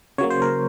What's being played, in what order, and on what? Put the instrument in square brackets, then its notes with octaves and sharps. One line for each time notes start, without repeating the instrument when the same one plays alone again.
[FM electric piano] C#3 F#3 A#3 C#5
C5
A#4